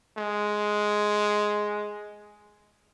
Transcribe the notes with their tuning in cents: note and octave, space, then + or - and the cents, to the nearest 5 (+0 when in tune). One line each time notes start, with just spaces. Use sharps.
G#3 +5